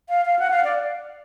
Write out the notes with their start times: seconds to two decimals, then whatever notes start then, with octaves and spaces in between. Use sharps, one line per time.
0.09 F5
0.26 F5
0.39 F#5
0.50 F5
0.64 D5